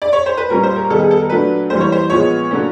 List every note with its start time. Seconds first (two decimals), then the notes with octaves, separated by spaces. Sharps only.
0.02 D5
0.13 C#5
0.26 C5
0.37 B4
0.50 A#2 G3 A#3 C#4 A#4
0.63 C5
0.76 A#4
0.90 D#3 G3 B3 A4
1.00 G#4
1.11 A4
1.20 A#4
1.29 A#2 F#3 A3 D4 B4
1.70 E3 G3 A#3 C5
1.80 C#5
1.92 C5
2.10 A#2 F3 G#3 B3 C#5
2.51 D3 F#3 A#3 C#4